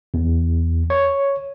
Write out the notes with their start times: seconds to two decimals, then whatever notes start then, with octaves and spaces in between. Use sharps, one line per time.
0.14 E2
0.90 C#5